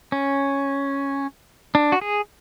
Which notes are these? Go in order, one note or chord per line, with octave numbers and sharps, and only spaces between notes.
C#4
D4
F#4
G#4